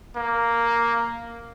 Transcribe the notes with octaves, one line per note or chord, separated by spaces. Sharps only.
A#3